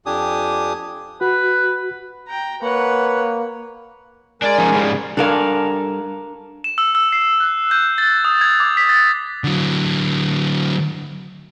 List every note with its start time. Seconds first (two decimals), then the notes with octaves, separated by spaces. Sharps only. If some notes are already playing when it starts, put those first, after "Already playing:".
0.06 F2 D4 G4 G#5 D#6
1.21 F#4 B4
2.28 G5 A#5
2.63 A#3 B4 C#5 F#5
4.42 G#3 D4 A#4 D5 G#5
4.58 F3 C#4 D#4
4.72 G#2 C#3 G3
5.17 G2 D4 A4 A#4 F5 G#5
6.64 E7
6.78 E6
6.95 E6
7.12 C7
7.40 F#6
7.71 G6
7.98 A6
8.25 D#6
8.41 G#6
8.60 D6
8.77 B6
8.89 A6
9.44 D3 F#3